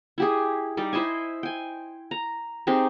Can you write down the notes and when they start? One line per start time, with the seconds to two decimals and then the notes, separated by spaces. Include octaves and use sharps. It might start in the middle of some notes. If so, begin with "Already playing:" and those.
0.18 E4 G4 G#4
0.77 G3 D#4 D5
0.93 E4 C5 D#5 G#5
1.43 G5 G#5
2.11 A#5
2.67 C4 D#4 G4 G#4